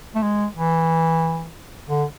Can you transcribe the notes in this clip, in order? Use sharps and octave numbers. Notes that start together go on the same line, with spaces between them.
A3
G#3
E3
D3